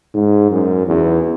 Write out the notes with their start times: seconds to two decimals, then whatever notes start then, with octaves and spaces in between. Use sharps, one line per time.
0.14 G#2
0.51 F#2
0.86 E2